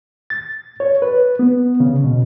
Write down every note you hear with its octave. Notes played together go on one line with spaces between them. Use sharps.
A6
C#5
B4
B3
C#3
B2